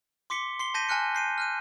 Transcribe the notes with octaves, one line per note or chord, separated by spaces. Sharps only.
C6 D6 B6 C#7 G7
C6 C7 G7
A5 G6 A#6 B6 D#7
G#5 A5 F6 F#6 C#7
G6 C7 D#7
F6 F#6 D#7